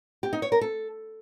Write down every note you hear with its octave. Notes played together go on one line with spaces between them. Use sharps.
G4
D#4
C#5
A#4
A4